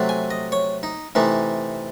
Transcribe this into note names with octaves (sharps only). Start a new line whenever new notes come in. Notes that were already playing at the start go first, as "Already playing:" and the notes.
Already playing: C3 F#3 A3
G#5
D#5
C#5
D#4
C3 E3 A3 D#4